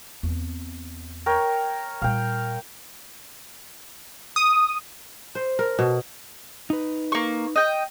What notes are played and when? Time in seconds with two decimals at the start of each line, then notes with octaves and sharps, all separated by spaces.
0.23 E2 C4
1.26 A#4 C#5 G5
2.02 A#2 G3 F5 G5
4.36 D#6
5.35 C5
5.59 A#4
5.79 B2
6.70 D#4 B4
7.12 A#3 C#6
7.56 D#5 G5